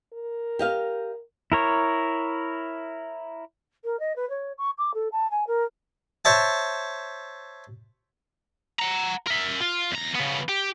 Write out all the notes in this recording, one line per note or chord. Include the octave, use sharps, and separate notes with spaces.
A#4
G4 D#5 F5
E4 A#4 C#5
A#4
D#5
B4
C#5
C#6
D6
A4
A5
G#5
A#4
C5 C#5 E5 A5
F#5 A#5
A#4 E5
F4
E2 A#5
C#3 B3
G4